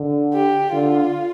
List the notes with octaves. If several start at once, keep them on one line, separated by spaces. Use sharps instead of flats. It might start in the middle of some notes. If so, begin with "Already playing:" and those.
Already playing: D3
G4
D3 F4